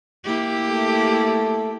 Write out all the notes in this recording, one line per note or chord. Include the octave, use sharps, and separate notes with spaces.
A#3 E4 G4
A3